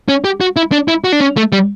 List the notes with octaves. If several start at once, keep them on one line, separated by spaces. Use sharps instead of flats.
C#4
G4
F#4
E4
D4
E4
F#4
D4
C#4
A3
G3